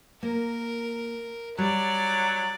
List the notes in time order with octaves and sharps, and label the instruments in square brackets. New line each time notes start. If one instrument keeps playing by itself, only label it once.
[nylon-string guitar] A#3 [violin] A#4
[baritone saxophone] F#3 [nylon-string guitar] G3 [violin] D5